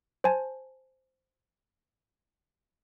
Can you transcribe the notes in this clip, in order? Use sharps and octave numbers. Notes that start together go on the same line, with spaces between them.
C5 G#5 A5